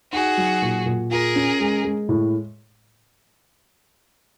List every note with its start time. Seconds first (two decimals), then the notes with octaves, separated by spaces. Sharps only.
0.12 D#4 F#4 G#4
0.37 F#3
0.62 A#2
0.86 A#2
1.11 F4 G#4 A#4
1.36 C#4
1.60 G#3
1.85 G#3
2.09 A2